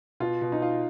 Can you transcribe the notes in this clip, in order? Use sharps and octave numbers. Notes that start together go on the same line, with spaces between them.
B2 F4
B2
D#4
F4